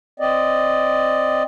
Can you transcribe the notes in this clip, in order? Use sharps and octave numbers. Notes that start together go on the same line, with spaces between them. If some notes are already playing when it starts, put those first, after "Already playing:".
C4 D5 D#5